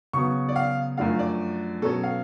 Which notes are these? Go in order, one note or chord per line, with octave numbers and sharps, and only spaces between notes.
C#3 F#3 B3 C#6
D5
F5
F#2 F3 A3 D4 F5
D5
B2 F#3 C#4 A4
F5